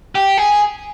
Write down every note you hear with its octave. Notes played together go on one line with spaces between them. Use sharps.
G4
G#4